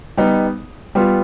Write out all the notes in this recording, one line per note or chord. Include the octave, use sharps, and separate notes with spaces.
G3 B3 D#4
G3 B3 F4